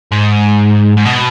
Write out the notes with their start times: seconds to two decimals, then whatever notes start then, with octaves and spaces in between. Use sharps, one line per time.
0.12 G#2
0.97 G#2
1.05 B2